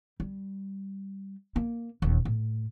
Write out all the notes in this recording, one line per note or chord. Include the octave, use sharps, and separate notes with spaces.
G3
A#3
D#1 D#2
A2